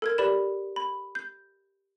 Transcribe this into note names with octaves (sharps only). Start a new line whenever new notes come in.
A4 A#4 G#6
G4 B4 D5 B5 E7
B5
G6